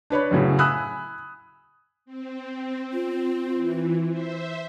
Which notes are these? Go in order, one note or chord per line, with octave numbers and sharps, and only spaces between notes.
D4 B4 C#5 B5
F#2 A2 C#3 F#3
G#5 B5 D#6 E6 F#6
C4
F4
E3
C5 E5